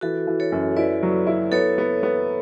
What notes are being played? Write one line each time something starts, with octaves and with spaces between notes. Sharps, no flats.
E3 F#4 A4
E3
A4 C#5
F#2
E4 B4 D5
F#3
E4
B3 A4 C#5
B3
B3